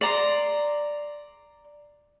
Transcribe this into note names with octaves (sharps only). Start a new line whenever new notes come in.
D5 A#5 C6